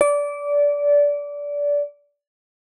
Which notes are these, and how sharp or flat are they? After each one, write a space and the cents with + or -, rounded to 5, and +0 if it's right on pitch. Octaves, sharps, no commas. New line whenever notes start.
D5 -20